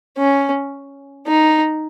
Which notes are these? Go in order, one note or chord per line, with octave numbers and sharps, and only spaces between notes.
C#4
D#4